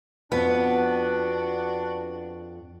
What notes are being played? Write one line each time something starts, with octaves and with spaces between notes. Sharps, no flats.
F2 B3 D4 F#4